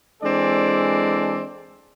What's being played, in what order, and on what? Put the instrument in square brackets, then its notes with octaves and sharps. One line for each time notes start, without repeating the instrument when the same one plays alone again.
[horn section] E3 G#3 C4 D4 A4 D5